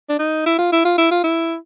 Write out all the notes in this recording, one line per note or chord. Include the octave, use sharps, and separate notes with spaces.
D4
D#4
E4
F4
E4
F4
E4
F4
E4